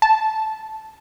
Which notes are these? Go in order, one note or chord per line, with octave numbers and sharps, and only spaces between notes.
A5